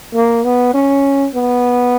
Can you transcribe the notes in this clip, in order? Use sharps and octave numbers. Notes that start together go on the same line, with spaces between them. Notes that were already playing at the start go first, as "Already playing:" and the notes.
A#3
B3
C#4
B3